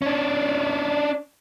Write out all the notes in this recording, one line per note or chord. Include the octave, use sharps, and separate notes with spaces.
C#4 D4